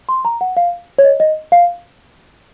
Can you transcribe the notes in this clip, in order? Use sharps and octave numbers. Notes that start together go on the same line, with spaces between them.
C6
A#5
F#5
F5
C#5
D#5
D#5
F5